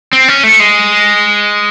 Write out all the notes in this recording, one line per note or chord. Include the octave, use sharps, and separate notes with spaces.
C4
C#4
A3
G#3